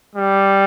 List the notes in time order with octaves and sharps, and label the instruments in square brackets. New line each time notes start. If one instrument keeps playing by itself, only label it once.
[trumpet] G3